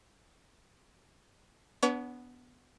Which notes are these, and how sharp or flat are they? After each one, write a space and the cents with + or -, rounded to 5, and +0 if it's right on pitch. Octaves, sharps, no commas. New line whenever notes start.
B3 +0 D4 -20 C#5 +40